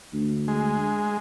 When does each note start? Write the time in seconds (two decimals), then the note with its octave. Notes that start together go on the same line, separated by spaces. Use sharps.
0.13 D2
0.48 G#3